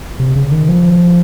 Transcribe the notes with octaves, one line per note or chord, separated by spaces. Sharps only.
C3
C#3
D#3
F3